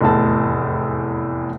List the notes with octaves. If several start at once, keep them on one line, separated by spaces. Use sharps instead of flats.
F1 E2 A2 A5